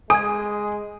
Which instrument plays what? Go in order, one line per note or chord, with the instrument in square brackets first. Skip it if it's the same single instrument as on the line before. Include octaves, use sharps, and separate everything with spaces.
[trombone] G#3 [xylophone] G#5 G#6 [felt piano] D#6